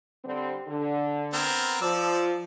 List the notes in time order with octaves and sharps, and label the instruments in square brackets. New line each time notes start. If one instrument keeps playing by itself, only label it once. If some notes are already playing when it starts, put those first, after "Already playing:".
[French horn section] D3 G3 C4
D3
[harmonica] B3 C4 A#4
[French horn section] F3 [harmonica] D5 E6